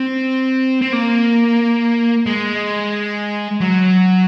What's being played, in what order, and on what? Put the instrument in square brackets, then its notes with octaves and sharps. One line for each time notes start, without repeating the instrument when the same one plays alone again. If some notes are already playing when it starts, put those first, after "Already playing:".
Already playing: [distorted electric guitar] C4
C4
A#3
G#3
F#3